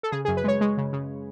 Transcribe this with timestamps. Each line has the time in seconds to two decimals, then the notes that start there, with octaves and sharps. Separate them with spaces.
0.03 A4
0.12 C#3 G#4
0.25 F#2 G#4
0.37 B4
0.44 G#3 C#5
0.61 G#3
0.78 C#3
0.93 C#3